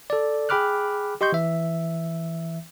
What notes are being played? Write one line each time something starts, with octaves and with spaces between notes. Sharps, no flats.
A4 D5
G#4 G5 B5 D6 F6 F#6
G4 D#5 C6 C#6 G6
E3 E5